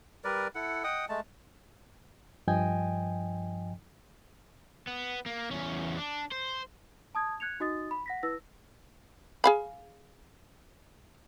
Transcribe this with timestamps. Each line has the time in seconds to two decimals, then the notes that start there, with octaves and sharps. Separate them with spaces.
0.24 G3 A#4 B4 D5
0.55 E4 A4 F#5
0.84 D#5 F#5 G5 D#6
1.09 G#3 A3 A5
2.47 G2 F3 D#5 G5 G#5
4.87 B3
5.26 A#3
5.51 E2 C#4
5.97 D4
6.32 C5
7.15 A5 D#6 G#6
7.40 F#6 G#6 C#7 F7
7.60 D#4 F#4 D#5 D#6 A6
7.91 B5
8.06 F#5 A#6 B6
8.23 E4 B4 E6 A#6
9.44 G#4 F5 B5